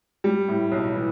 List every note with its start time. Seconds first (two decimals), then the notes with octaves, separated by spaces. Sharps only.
0.24 G3
0.48 A2
0.72 B1
0.95 E3